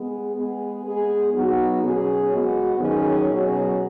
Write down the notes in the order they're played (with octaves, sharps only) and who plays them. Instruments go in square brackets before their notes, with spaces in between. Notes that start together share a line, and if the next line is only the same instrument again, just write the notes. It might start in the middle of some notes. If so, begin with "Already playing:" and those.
Already playing: [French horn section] G#3 B3 G#4
G#3 B3 G#4
G#3 B3 G#4
F#3 B3 D#4 F#4
B2 F#3 C#4 G#4
G#3 B3 F#4
D#3 F#3 C#4 G#4
B2 F#3 C#4 G#4